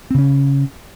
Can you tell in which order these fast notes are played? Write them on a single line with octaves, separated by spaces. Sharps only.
C4 C#3 C#4